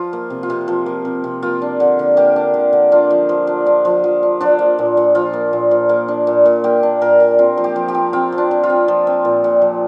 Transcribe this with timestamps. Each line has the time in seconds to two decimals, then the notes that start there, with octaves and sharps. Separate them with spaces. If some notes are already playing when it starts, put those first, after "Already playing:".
Already playing: F3 F4
0.13 A#3
0.30 C3
0.43 F4
0.50 C3
0.68 F3
0.86 A#3
1.05 C3
1.24 C3
1.42 A#3 F4
1.62 D4
1.80 D3
1.99 D3
2.17 A#3 G4
2.36 D4
2.54 D3
2.73 D3
2.92 D4 F4
3.10 F3
3.29 F3
3.47 D4
3.66 D4
3.85 F3
4.04 F3
4.23 D4
4.40 F3 D4
4.59 A#3
4.78 A#2
4.97 A#2
5.15 F3 F4
5.33 A#3
5.53 A#2
5.71 A#2
5.89 A#3
6.08 D4
6.27 A#2
6.45 A#2
6.64 A#3 G4
6.83 D4
7.01 A#2 A#4
7.20 A#2
7.39 C4 F4
7.57 F3
7.64 G4
7.76 F3
7.88 G4
7.94 C4
8.13 C4 F4
8.32 F3
8.38 D4
8.51 F3
8.63 F4
8.70 C4
8.88 F3
9.07 C4
9.25 A#2
9.44 A#2
9.61 F3